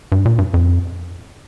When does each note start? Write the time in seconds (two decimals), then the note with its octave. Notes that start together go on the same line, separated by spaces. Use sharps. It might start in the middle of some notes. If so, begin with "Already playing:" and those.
0.12 G2
0.25 A#2
0.38 G2
0.54 F2